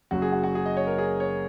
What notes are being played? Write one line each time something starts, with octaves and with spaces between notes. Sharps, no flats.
F#1 F#2 F#3 F#4
G#4
F#4
F#4
G#4
D#5
C#5
A#4
G#4
C#5